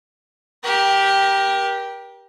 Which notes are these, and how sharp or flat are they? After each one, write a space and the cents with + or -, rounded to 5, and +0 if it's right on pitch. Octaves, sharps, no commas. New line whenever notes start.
G4 +0 A#4 +30